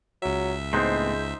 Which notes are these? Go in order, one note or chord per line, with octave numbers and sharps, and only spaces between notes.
C#2 F#3 E5
A2 G#3 B3 C4 D#4 C5